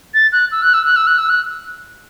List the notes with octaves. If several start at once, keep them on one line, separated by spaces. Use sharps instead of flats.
A6
F#6
E6
F#6
E6
F#6
E6
F#6
E6
F#6